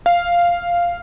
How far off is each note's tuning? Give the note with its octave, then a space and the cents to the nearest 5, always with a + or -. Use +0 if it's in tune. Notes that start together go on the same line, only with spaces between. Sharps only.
F5 -5